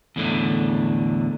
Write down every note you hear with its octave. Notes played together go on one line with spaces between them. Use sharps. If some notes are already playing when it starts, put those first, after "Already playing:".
E2 A2 D3